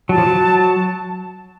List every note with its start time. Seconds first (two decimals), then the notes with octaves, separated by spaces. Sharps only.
0.09 F#3 A5
0.18 F3
0.26 F#3